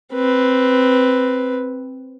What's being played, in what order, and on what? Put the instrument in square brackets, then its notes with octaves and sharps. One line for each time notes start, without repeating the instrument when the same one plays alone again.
[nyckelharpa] C4 B4